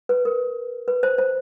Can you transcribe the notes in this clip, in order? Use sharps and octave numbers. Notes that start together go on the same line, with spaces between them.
B4
A#4
B4
C5
C5